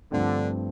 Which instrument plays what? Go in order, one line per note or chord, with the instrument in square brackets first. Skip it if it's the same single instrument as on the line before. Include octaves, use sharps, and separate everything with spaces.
[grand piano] G2 F3 A3 C4 [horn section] D3